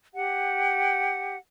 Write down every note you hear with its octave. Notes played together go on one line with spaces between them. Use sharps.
G4 F#5